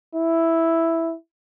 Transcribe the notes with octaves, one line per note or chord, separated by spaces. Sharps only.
E4